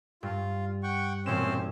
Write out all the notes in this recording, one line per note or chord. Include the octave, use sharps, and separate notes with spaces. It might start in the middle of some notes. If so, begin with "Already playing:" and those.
G2 F4
F#5 G5 C#6
E1 A#2 C4 C#4 C5 E7